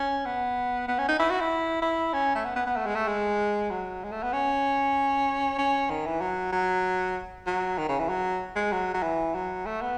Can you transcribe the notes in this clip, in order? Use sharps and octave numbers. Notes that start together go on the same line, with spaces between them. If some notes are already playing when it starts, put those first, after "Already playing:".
Already playing: C#4
B3
B3
C#4
D#4
E4
F#4
E4
E4
C#4
A3
B3
B3
B3
A3
G#3
A3
G#3
F#3
G#3
A3
B3
C#4
C#4
D#3
E3
F#3
F#3
F#3
D#3
C#3
E3
F#3
G#3
F#3
F#3
E3
F#3
A3
B3